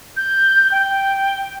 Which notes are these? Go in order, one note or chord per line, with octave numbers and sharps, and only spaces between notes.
G6
G5